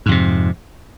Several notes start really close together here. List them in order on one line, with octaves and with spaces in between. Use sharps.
G#2 F2 C3